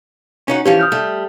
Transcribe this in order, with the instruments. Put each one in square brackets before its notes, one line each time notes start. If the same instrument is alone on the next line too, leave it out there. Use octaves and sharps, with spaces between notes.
[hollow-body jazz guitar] C#4 D#4 F#4
[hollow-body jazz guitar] E3 F3 C#4 [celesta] G4
[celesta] D#6 F6 G6
[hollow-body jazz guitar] G3 A3